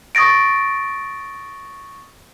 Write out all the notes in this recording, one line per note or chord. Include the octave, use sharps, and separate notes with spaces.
C#6 D#6 A6 A#6 D7